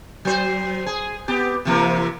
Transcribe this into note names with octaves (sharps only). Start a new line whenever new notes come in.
F#3 C5
G#4
B3 G4
C3 E3 A#3